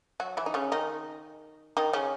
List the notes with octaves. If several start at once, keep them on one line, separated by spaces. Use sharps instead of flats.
F#3 F#4
E3 E4
D#4
C#3 C#4
D#3 D#4
D#3 D#4
C#3 C#4